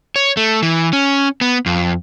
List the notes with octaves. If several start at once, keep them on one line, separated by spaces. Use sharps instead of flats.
C#5
A3
E3
C#4
B3
F2